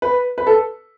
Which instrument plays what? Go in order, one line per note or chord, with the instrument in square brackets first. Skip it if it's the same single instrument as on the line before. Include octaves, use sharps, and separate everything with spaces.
[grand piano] B4
B4
A4